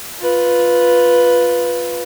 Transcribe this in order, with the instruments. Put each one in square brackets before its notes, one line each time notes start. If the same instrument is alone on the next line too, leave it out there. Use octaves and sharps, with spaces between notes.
[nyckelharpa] F4 B4